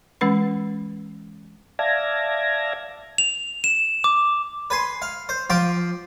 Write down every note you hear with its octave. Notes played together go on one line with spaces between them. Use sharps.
E3 G#3 C#4 B4 B5
D5 E5 F5 A5 G#6 A#6
F7
E7
D6
B4 G#5 C6
F5
C5
F3 G5 C6 D6